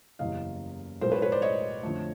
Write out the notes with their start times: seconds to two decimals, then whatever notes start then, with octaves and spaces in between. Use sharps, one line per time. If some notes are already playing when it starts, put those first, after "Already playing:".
0.19 F#1 E2 C#3 E3 G3 D#5 F5
1.01 B1 A2 F3 G#3 B3 A#4 C5
1.11 B4 C#5
1.22 B4 C#5
1.32 C5 D5
1.42 C#5 D#5
1.83 F2 D3 F3 A3